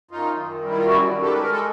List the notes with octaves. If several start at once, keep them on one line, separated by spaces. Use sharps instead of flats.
F#2 D#4 F4
D#3
G3
E4
F4
F#2 E4 F#4
D#3
G4 A4
G#3 B4
A#4
A4